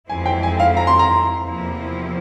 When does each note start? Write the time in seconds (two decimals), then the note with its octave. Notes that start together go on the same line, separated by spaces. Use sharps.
0.09 F2 E3 G#3 C4 E4 G#5
0.26 G5
0.43 G#5
0.60 F5
0.77 A#5
0.87 C6
0.99 A#5
1.44 E2 C3 F3 A#3 E4